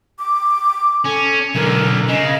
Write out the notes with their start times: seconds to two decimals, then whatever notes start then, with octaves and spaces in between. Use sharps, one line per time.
0.19 D6
1.05 C#4 A4
1.55 B1 D3 A#4
2.08 C#3 D#5